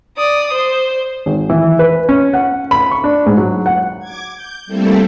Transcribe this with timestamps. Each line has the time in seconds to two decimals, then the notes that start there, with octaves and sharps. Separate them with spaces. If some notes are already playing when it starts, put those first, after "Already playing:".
0.17 D5 D#6
0.54 C5
1.26 G#1
1.50 E3
1.79 B4
2.09 C#4
2.34 F#5
2.71 B5
2.91 C#6
3.04 D4
3.26 G#2
3.37 F#3
3.66 F#5
4.00 D6 G#6
4.34 G6
4.66 G3 A3 A#3 C4 E4 A4